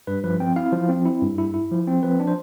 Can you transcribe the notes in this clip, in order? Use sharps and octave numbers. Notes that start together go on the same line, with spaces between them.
G2 B4
F3 B4
C4 G5
E4 F5
F3
C4
E4
G2
E4
E4
F3
C4
F3 B4
D4
C5